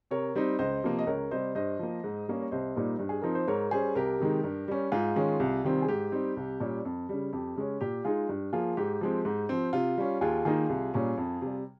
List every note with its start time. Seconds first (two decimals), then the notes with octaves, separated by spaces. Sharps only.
0.11 C3 A#4 C#5
0.35 G3 C4 D#4
0.59 C#2 C5 D#5
0.84 C3 F3 A#3
0.99 D#5
1.07 C#2 A#4 C#5
1.31 C3 G3 C5 D#5
1.55 G2 C5 D#5
1.79 F3 A#3
2.04 G#2
2.28 G3 A#3 C#4
2.42 C#5
2.51 C2 C5 D#5
2.76 A#2 G3 A#3 D#4
2.99 G2
3.09 G#4
3.22 F3 C4 D#4 A#4
3.35 C5
3.48 G#2 A#4 C#5
3.71 G3 C#4 G#4 C5
3.95 C2 G4 A#4
4.20 C3 D#3 G#3 D#4
4.44 G2
4.68 G3 C#4
4.92 G#2 F4 G#4
5.16 D#3 G#3 C#4
5.40 C2
5.64 C3 D#3 G3 C4
5.82 G#4
5.88 G#2 G4
6.12 G3 C4 D#4
6.37 C2
6.60 A#2 G3 C#4
6.85 F2
7.09 C#3 G3
7.32 F2 G4
7.56 C#3 G#3 C#4
7.81 A#2 G4
8.04 G#3 D#4 F4 G#4
8.29 G2
8.53 F3 A#3 F4 G#4
8.77 G#2 G4
9.01 F3 G#3 C4
9.25 G#2
9.49 F3 C4
9.73 C3 F4
9.97 G3 C#4
10.21 D#2 F4 G#4
10.45 D#3 A#3 D#4 F4 G#4
10.69 C2
10.94 A#2 G3 C#4
11.17 F2
11.42 C3 G3